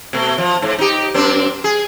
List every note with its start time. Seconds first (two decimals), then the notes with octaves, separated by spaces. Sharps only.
0.13 B2 A3
0.38 F3
0.62 G#2
0.79 D#4 G4
1.14 F#2 C4 D4
1.64 G#4